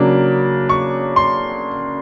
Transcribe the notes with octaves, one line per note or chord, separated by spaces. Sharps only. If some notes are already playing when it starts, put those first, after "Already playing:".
Already playing: C#3 F#3 A#3 D4
C#6
C6